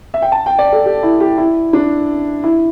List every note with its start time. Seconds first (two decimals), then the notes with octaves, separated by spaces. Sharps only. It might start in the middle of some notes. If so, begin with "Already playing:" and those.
0.14 E5
0.22 G5
0.32 A5
0.46 G5
0.58 D5
0.72 A4
0.86 G4
1.03 E4
1.20 G4
1.38 E4
1.73 D4
2.44 E4